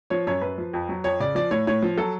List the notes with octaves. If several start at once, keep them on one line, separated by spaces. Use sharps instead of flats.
F3 C#5
F#2 C#5
F#2 B4
F3
F2
F#3
F2 C#5
C#3 D5
F3 D5
A2 C#5
A2 C#5
F3
F#3 A4